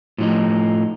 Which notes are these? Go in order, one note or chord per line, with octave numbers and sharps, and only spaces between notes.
A2 F3 D#4